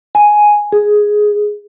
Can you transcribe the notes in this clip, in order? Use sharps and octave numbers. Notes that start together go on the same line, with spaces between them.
G#5
G#4